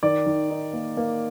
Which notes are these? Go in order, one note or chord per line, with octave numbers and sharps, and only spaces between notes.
D#3 D5
D#3
D#4
A#3
A#3